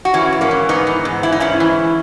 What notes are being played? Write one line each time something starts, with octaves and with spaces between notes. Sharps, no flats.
F#4
E3 C#4 E4
G#2
A#3 C#4
E3
G#2 B3 D#4
E3
G#2
E3 E4
D#4
G#2 C#4 E4
E3